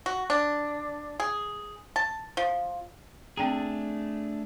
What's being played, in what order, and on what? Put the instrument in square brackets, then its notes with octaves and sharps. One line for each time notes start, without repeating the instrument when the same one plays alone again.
[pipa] F#4
D4
G#4
A5
F3
[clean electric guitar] A3 D4 G#4 [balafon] C4 G5 A#5